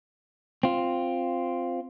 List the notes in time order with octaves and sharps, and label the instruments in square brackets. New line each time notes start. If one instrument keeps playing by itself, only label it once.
[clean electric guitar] C4 F4